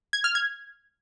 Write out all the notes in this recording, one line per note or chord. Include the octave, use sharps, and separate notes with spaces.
G#6
F6
G#6